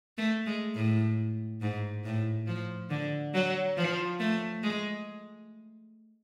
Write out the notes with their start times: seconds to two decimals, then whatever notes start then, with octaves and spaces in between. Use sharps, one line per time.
0.18 A3
0.46 G#3
0.75 A2
1.61 G#2
2.05 A2
2.47 F3
2.90 D3
3.34 F#3
3.77 F3
4.20 A3
4.63 G#3